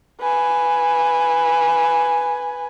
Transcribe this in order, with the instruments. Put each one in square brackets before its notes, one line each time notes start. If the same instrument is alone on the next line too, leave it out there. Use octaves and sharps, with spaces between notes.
[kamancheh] B4 G#5